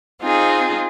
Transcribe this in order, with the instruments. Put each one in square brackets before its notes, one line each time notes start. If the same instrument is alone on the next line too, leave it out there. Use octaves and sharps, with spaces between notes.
[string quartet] C4 D#4 F4 G#4